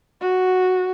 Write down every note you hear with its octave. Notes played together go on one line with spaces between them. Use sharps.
F#4